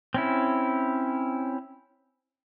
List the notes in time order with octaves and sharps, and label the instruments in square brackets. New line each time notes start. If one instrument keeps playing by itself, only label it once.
[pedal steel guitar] C4 C#4 E4